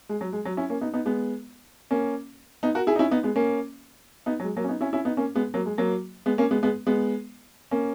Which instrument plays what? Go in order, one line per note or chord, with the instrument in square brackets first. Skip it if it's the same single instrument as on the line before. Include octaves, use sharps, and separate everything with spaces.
[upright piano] G#3
F#3
G#3
F#3
C#4 E4
A#3 C#4
B3 D#4
B3 D#4
G#3 B3
A#3 C#4
B3 D#4
F#4 A#4
E4 G#4
D#4
C#4 E4
B3 D#4
G#3 B3
A#3 C#4
B3 D#4
F#3
G#3
F#3 A#3
C#4
B3 D#4
C#4 E4
C#4 E4
B3 D#4
A#3 C#4
G#3 B3
F#3 A#3
G#3
F#3 A#3
G#3 B3
A#3 C#4
G#3 B3
G#3 B3
G#3 B3
A#3 C#4